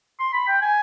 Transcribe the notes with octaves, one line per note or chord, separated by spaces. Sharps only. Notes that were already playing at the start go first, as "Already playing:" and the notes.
C6
B5
G5
G#5